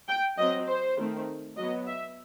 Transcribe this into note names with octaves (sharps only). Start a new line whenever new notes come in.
G5
F#3 C4 D#5
C5
D#3 A3 C4
F#3 B3 D#5
E5